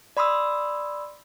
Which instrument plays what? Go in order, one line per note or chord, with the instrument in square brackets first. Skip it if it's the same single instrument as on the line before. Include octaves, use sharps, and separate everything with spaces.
[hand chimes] D5 B5 C6 D#6 E6